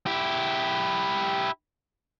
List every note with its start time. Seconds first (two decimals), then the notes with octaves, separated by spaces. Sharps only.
0.06 E4 G4